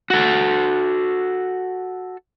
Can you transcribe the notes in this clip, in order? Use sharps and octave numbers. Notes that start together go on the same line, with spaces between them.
F#4 A4